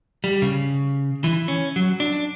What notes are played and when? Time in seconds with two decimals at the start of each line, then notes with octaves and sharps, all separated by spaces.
0.24 G3
0.42 C#3
1.24 E3
1.48 C#4
1.76 F#3
2.00 D4